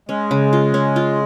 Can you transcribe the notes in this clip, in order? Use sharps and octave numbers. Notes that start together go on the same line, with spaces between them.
G#3 C#4
C#3
F4
C#4
F4